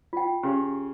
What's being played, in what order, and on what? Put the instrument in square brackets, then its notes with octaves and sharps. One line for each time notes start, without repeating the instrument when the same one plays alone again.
[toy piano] F4 G5
[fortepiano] C#3 [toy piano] G4